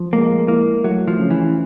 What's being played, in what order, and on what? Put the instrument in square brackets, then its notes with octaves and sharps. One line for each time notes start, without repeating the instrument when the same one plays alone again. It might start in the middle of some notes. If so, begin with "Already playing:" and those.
Already playing: [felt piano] F3
[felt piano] G#3 [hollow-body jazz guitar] A#3
[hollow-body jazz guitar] A#3 [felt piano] E4
[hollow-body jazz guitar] F#3 [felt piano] A3
[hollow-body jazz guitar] F3
[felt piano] C#3
[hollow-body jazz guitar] E3